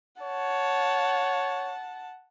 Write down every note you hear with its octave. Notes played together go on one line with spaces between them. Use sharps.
C#5 F#5 A5